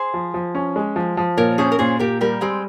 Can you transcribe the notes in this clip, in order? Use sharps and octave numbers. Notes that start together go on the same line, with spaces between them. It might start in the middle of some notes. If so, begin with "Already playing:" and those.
Already playing: G#4 C5
F3
F3
C#4
G#3
F3
F3
A#2 A#4 C#5
C#4 G#4 C5
A#4
A#2 G#4 C5
A#2 G4 A#4
G3 G4 A#4
G3 G#3 C4